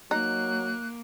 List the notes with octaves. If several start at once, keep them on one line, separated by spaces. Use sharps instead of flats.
F#3 A#3 D#4 F#6